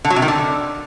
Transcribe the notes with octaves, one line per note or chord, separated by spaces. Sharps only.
D3
F#3
C3
D#3
D3